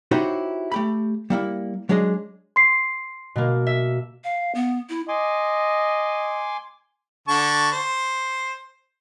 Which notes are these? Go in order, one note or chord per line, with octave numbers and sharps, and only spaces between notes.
D#4 E4 F#4 G4 C5 C#5
A3 G4 B5
G3 A#3 E4
F#3 G#3 D4 G#4 D#5
C6 C7
B2 A#3
E5
F5
B3
E4
D#5 G#5 C6 D6
D3 A5 C#6
C5